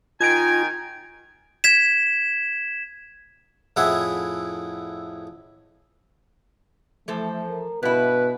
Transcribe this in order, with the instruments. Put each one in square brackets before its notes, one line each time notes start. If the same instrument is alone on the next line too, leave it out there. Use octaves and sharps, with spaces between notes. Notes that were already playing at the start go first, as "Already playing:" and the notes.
[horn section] D#3 D#4 G#5 [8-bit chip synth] F4 [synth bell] G#6 D7
[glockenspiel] G#6 B6 E7
[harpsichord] F2 A2 E4 G#4 E5 F#5
[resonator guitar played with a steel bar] E3 A4 C5 [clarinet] F3 [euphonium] A3
[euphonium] A#4
[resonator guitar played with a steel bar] G2 E4 [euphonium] B2 [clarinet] B4